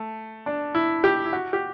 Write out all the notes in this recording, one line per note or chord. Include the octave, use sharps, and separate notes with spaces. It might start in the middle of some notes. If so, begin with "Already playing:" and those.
Already playing: A3
D4
E4
G4
E4
F#4
G4